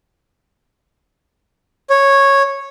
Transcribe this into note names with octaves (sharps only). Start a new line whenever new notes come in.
C#5